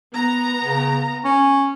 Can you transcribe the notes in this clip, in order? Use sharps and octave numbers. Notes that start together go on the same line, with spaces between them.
B3 A#5
C#3
C#4